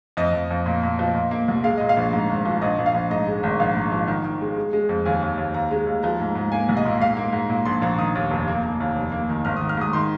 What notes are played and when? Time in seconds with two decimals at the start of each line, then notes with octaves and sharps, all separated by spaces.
0.17 F2 D#5
0.33 F2
0.51 F2
0.66 A#2
0.83 A#2
0.99 F3
1.15 A#2
1.31 A#3
1.48 C2
1.63 G#3 F5
1.77 A#2 D#5
1.89 F5
1.97 A#1
2.13 G#2
2.29 G#1
2.45 F3
2.61 A#1 D#5
2.78 A#1
2.86 F5
2.94 A#1
3.10 G#2 D#5
3.27 G#3
3.43 G#1
3.60 A#1 F5
3.75 G#2
3.92 F3
4.07 D#3
4.25 D#3
4.41 G#3
4.57 G#3
4.73 G#3
4.89 F2
5.05 D#2 G#5
5.22 D#2
5.38 D#2
5.54 D#2 A#5
5.71 G#3
5.87 D#2
6.03 F3 A#5
6.20 G#2
6.35 G#2
6.52 A#3 G#5
6.69 C2
6.77 D#5
6.85 A#2
7.00 G#2 F5
7.17 A#3
7.33 G#2
7.50 A#2
7.65 A#1 C6
7.82 A#1 A#5
7.99 D#3 D#6
8.15 D#2
8.31 F1
8.48 A#3
8.63 A#3
8.80 D#2
8.96 F1
9.12 A#3
9.29 D#3
9.45 G#1 F6
9.57 D#3 D#6
9.69 F6
9.77 G#2 D#6
9.93 D#3 C6